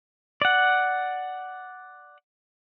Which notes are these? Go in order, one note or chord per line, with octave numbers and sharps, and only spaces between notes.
D5 F#5